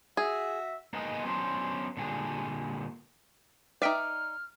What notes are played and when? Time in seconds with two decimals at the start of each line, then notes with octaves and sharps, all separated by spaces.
0.17 F#4 G#4 E5
0.93 A#3 B3 D#4 G#4 B4 D#5
1.24 F#3 B3 C#4 D4 C5
1.97 A#2 D3 G3 G#4
3.82 D#4 B4 D5 E5 G5 F6